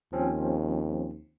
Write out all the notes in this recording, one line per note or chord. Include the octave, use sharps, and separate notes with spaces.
D#2 F3 C4 C#4